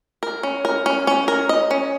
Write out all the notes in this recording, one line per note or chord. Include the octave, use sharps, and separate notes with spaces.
A#4
C#4
A#4
C#4
C#4
A#4
D#5
C#4